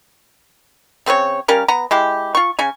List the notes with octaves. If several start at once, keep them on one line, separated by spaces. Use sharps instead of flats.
C#3 C4 F#4 C#5
G3 C#4 A#4 F5
B3 A#5
G#3 E4 G4
F4 C#6
C#3 C#4 G#5